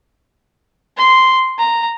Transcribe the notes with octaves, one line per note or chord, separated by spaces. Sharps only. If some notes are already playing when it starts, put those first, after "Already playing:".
C6
A#5